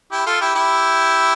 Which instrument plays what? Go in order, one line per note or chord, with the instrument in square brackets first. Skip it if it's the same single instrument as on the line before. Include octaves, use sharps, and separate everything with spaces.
[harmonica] E4 G4
F4 A4
E4 G4
E4 G4